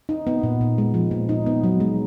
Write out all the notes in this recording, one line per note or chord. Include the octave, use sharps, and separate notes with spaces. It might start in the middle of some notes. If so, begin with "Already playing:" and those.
D#4
B3
A#2
A#2
G#3
F3
A#2
D#4
B3
F#3
G#3